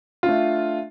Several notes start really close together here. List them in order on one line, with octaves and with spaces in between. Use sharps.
F4 D4 A3